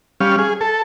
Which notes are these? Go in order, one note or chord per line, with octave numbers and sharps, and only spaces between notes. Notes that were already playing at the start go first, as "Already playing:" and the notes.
G3 C#4 F5
G#4
A4